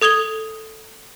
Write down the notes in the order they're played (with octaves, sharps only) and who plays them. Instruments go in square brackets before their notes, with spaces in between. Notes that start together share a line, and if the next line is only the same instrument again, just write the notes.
[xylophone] A4 D#6 G#6 F7 G7